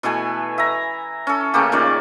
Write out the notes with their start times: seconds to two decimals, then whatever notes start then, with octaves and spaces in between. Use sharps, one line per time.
0.03 B2 E3 A3 G#5
0.58 E5 A#5
1.27 C#4 A4
1.54 C#3 A3 A#3 G4
1.72 A#2 D#3 C#4 D5